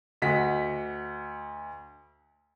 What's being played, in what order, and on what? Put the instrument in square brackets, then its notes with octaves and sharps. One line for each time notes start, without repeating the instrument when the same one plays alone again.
[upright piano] D2 D#5 F#5 B6